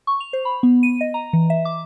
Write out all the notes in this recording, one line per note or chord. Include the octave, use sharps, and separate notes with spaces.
C#6
F7
C5
B5
B3
D#7
D#5
A#5
E3
E5
D6